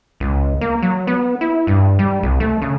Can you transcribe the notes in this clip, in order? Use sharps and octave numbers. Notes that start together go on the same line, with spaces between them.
C#2
A#3
F#3
B3
E4
G2
G3
C2
A3
C#3